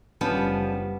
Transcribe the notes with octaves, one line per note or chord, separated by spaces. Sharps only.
F#1 F3 G3 B3 C#4 D4